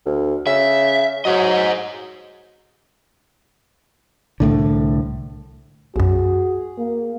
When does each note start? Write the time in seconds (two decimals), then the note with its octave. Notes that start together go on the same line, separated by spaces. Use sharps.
0.06 D2
0.47 C#3 E5
1.25 F#3 G#4 C5 D#5
4.40 C2 A2 D3
5.96 B1 F#2 F#4 G#4
6.78 A#3